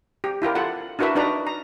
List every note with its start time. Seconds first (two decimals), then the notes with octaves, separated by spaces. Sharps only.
0.24 G4
0.42 E4 F4 G4 A#4
0.55 F4 A4 F#5
0.99 D4 E4 F#4 A#4 B4 E5
1.16 D4 D#4 F#4 B4 D5 A#5
1.47 A#5